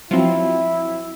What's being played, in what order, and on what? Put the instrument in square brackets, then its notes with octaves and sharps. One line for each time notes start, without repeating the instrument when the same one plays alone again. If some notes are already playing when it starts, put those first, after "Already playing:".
[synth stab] F3 F#3 C4 [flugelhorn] E4